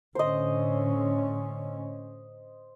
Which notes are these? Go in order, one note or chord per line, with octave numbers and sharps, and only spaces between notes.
A2 D3 C#4 C5 D#5